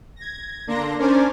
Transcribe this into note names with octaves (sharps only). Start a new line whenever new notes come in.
G#6 A#6
D3 A#3 D4 A#5 C6 A#6
C#4 D4 A#4 C5 D5 G#5